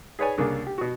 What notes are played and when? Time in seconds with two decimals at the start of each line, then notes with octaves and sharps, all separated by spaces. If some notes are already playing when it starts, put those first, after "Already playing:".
0.19 G#4 B4 C#5 D5 G#5
0.38 C2 C#3 A#3 D4 G#4
0.66 G4
0.78 B2 F#4